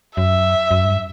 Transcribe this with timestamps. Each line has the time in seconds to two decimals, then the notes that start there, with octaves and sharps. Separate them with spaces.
0.17 F#2 E5
0.71 F#2
0.85 G2